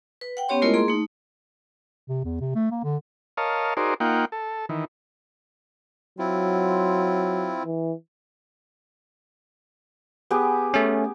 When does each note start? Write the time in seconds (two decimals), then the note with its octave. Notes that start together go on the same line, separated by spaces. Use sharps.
0.21 B4
0.37 F#5 G5
0.49 B3 C#4 G4 C#5 C6
0.62 G#3 A3 E4 F4 A#4 D#5
0.73 A#3 G#4 C6
0.88 A3 D#4
2.08 C3
2.24 E2
2.40 C3
2.55 A3
2.71 A#3
2.84 D3
3.37 A#4 C#5 D#5 F5 A5
3.77 D#4 F#4 G#4 A#4 C5 D5
4.00 A#3 D#4 F4 F#5 G5
4.32 A4
4.69 D#3 E3
6.19 F#3 C4 E4 F4
7.65 E3
10.31 B3 G4 G#4
10.74 A3 C#4